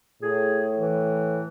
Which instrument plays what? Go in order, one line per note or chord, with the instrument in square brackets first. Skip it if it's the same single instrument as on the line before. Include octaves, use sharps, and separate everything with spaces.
[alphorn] A2 [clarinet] G#4
[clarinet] E3